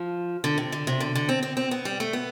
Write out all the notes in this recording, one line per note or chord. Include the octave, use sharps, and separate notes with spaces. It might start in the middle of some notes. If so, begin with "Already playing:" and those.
Already playing: F3
D3
C3
D3
C3
D3
D3
C4
C4
C4
B3
G3
A3
B3